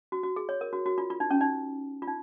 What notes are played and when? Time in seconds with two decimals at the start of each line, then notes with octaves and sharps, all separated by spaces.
0.12 F#4
0.23 F#4
0.36 G#4
0.49 C#5
0.61 A#4
0.73 F#4
0.86 F#4
0.98 F4
1.10 F4
1.20 D#4
1.31 C#4
1.41 D#4
2.02 F4
2.07 D#4